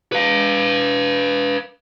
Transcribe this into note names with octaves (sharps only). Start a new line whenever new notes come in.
B4 F5